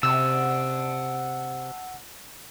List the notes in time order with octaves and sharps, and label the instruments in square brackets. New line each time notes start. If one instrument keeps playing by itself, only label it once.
[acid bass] C3 [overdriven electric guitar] F#5 A5 [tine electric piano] E6